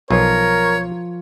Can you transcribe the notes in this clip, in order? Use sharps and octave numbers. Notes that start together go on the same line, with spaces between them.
B1 F3 A#4 C#5